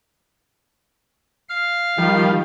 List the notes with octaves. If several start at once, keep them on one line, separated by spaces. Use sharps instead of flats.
F5 F6
D#3 F3 G3